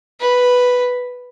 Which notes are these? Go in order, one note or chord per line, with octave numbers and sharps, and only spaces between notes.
B4